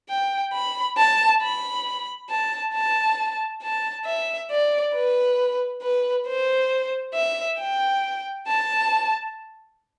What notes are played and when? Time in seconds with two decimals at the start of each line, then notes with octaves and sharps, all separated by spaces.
0.09 G5
0.53 B5
0.97 A5
1.42 B5
2.29 A5
2.74 A5
3.63 A5
4.05 E5
4.51 D5
4.94 B4
5.82 B4
6.27 C5
7.14 E5
7.59 G5
8.47 A5